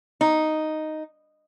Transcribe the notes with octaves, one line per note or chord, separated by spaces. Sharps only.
D#4